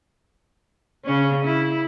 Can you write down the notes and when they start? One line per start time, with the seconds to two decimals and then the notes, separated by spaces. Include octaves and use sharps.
1.05 C#3 C#4
1.45 E4